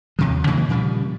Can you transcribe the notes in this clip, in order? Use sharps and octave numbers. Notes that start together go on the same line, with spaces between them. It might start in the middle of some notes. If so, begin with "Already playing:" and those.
D#2 C3 F3
C3 D#3 F#3 A#3
A#2 C#3 F3 G3